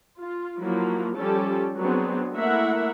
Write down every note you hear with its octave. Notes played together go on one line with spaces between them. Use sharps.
F4
F3 F#3 A#3 E4 F#4
F3 G3 C#4 G4 A4 A5
F#3 B3 C4 D4 G#4
A3 A#3 E4 A#4 E5 F#5